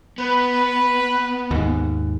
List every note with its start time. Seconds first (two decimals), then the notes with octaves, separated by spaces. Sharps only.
0.18 B3 B4
1.51 D#2 G#2